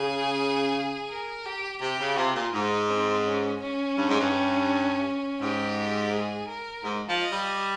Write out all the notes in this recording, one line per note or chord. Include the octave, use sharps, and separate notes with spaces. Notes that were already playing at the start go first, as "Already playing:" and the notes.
Already playing: C#3 G#4
A#4
G4
C3 G4
C#3
C3 F4
A#2
G#2 D#4
C4
C#4
C#4
G2
G#2
G2
G#2 G4
G#4
A#4
G#2
F3
D#5
G3